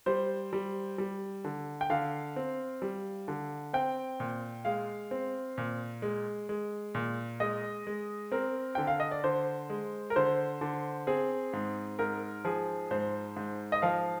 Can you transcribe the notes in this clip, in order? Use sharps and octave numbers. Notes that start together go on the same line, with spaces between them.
G3 C5
G3
G3
D3
G5
D3 F5
C4
G3
D3
C4 G5
A#2
G#3 F5
C4
A#2
G#3
G#3
A#2
G#3 D#5
G#3
C4 A#4
D3 G5
F5
D#5
D5
D3 C5
G#3
A#4
D3 C5
D3
C4 G#4
G#2
G#2 A#4
F3 G#4
G#2 C5
G#2
D#5
F3 F5